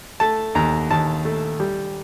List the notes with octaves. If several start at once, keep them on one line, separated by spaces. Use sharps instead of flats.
A3 A5
D#2 A#5
D#2 A5
A3
G3